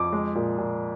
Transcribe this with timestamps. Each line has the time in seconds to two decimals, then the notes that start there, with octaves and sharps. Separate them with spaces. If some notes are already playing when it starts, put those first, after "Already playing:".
Already playing: F2 D6
0.12 G#3
0.35 A#2
0.58 A#2